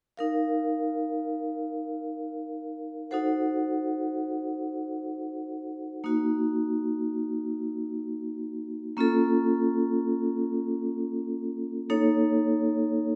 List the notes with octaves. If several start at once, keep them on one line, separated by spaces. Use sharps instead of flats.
D#4 A#4 F5
D#4 F#4 A4 C5 F#5
A#3 D#4 F#4
A#3 C#4 F4 A4
A#3 D#4 A4 C#5